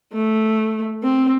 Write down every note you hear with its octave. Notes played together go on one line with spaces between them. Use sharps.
A3
C4